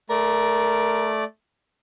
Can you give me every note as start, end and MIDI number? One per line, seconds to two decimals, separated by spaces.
0.10 1.24 57
0.10 1.14 70
0.10 1.24 74